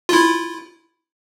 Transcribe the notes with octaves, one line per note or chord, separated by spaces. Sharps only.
E4 F4